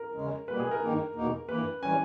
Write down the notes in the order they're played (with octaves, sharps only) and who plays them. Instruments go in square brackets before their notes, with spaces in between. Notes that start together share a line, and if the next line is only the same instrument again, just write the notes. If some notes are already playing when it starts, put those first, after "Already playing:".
Already playing: [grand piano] A#4
[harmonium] E2 C#3 G#3 C#4
[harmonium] B2 G3 A#3 [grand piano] B4
[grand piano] G#4
A#4
[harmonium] G2 D#3 A#3 D#4
E2 B2 A#3 D#4
[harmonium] G2 E3 A#3 [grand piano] B4
[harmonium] E3 G3 C#4 [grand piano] G#5